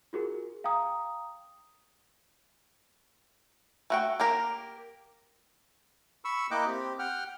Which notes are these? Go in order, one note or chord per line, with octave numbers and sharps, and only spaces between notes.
F4 F#4 G#4 A#4
F5 G5 A#5 D#6
A3 F#4 G5
A#3 G4 A#4
B5 C#6 E6
A#3 E4 D#5 G5 D6 F#6
C4 G4
F#5 G5 F6